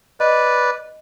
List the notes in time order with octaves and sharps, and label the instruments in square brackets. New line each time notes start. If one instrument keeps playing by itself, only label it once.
[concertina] B4 D5 [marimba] D#5